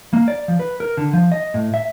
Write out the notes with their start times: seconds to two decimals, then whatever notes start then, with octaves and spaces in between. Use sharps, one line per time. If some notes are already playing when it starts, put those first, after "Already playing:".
0.13 A#3
0.28 D5
0.48 F3
0.60 B4
0.80 A#4
0.97 D3
1.13 F3
1.32 D#5
1.54 A2
1.74 E5